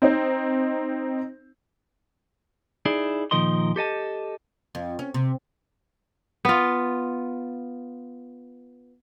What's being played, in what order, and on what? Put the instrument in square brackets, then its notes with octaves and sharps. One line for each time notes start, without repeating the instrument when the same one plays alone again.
[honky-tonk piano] C4 D#4 C5
[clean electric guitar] D#4 E4 G#4 D5
A#2 D#3 F3 A#4 D#5 C6
G4 A4 D#5 A5
[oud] F2
C#4
C3
[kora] B3 F4